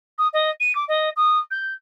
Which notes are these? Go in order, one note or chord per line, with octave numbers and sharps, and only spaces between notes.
D#6
D#5
D#7
D6
D#5
D#6
G6